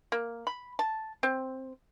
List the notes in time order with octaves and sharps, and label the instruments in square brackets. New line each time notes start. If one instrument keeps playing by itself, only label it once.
[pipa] A#3
B5
A5
C4